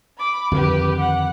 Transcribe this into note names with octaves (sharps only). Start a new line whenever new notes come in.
B5 D6
F2 D3 D#3 G4 B4
F#5